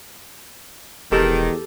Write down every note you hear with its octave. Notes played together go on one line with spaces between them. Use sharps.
E1 E2 D#3 G4 A4